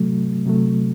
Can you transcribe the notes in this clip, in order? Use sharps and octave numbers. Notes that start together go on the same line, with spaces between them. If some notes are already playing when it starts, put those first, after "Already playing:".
Already playing: C3 F#3 A3
C3 F#3 A3